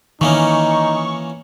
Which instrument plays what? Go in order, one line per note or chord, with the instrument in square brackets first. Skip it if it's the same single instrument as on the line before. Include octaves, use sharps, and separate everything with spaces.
[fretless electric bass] D#3 [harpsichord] E3 A#3 C#4 [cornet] D#4 [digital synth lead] C#6